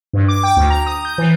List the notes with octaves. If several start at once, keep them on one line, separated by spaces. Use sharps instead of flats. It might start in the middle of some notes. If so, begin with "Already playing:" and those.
G2
D6
G5
D2
A#5
D#6
G6
E3